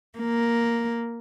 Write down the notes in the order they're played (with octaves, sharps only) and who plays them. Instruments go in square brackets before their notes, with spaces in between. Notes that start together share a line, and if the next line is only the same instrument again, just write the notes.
[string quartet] A#3